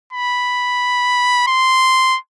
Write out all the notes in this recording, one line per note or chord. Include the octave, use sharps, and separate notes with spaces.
B5
C6